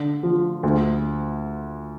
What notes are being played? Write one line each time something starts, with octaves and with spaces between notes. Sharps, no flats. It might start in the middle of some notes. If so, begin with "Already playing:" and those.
Already playing: D3
F3
D2